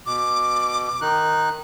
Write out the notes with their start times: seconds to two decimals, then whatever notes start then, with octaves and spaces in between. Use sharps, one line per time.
0.06 B2 D6
1.01 D#3 D#4 F#6